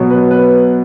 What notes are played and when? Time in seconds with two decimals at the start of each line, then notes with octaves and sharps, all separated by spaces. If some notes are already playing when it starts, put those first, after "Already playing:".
Already playing: B2 F#3
0.10 B4
0.31 B4